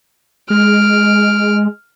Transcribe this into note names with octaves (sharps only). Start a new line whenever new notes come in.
G#3 F6 D7